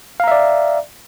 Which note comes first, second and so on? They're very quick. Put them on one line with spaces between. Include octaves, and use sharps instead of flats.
F5 A#5 E5 D5